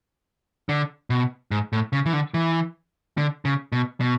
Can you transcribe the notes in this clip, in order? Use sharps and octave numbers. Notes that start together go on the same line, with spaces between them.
D3
B2
G#2
A2
C#3
E3
D3
E3
D3
C#3
B2
B2